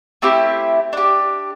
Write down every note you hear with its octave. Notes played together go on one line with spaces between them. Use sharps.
A3 C4 E4 G4
D4 G4